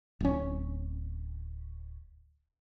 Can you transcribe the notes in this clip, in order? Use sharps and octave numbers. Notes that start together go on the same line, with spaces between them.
D1 C#4